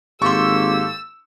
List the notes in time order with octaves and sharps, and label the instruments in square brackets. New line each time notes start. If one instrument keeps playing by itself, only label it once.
[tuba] G#1 [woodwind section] A#3 G4 A4 [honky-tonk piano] C6 C#6 [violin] E6